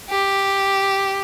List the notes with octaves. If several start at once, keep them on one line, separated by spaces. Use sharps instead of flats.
G4